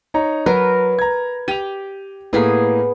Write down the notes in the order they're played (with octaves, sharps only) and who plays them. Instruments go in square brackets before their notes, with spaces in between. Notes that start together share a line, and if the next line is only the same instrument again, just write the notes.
[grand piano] D#4 C#5 A#5
[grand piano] F#3 [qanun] A#4 B4
[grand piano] A#5 G#6
[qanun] G4 [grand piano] D#7 F7
[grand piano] A2 A#3 [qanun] B3 G#4 B5